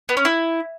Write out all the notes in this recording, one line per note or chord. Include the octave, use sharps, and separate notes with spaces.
B3
C#4
E4